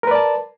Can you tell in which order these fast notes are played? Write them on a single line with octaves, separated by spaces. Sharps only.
A#4 B4 D5 A5